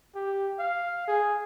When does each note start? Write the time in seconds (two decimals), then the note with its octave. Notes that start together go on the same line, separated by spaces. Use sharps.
0.15 G4
0.59 F5
1.08 G#4